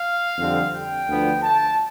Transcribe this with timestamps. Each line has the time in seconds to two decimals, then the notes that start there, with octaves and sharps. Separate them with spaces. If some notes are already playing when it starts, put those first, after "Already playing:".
Already playing: F5
0.38 F2 D3 G3 C4
0.72 G5
1.08 D2 D3 F3 B3
1.43 A5